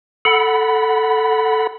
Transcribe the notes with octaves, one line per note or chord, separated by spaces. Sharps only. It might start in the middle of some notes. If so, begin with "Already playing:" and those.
A4 F#5 B5